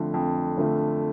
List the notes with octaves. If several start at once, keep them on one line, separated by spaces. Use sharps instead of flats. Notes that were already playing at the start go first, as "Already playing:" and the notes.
Already playing: F2 D3 F3 A3
F2
D3 F3 A3